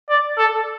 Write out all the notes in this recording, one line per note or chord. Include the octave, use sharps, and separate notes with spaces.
D5
A4